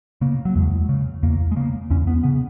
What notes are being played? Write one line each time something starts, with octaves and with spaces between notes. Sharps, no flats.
C#3 A#3
F#3
E2 G#3
C#3
E2 A#3
G#3
C#3 A#3
E2 C#4
B3
C#3 B3